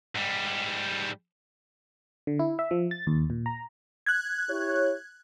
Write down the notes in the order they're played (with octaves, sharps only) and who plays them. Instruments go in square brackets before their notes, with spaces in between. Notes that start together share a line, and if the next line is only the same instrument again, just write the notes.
[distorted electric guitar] G#2 G3
[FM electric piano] D3
E4
E5
F3
A6
D#2
A#2
A#5
[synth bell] F#6 G#6
[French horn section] E4 G4 C#5